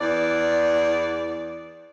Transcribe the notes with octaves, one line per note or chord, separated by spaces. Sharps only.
E2 D5